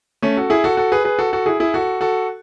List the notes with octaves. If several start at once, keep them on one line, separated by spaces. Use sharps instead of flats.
A3 C#4
F#4 A4
E4 G#4
F#4 A4
F#4 A4
G#4 B4
G#4 B4
F#4 A4
F#4 A4
E4 G#4
E4 G#4
F#4 A4
F#4 A4